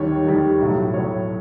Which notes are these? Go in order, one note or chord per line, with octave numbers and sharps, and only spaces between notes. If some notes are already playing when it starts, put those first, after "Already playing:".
Already playing: D#2 D#3 G3 C#5
D#2 D#3 G3
B1 A2 F#3
B1 A2 F#3 C#5